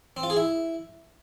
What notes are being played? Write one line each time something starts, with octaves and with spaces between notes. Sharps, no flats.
C4
F4
G#4
E4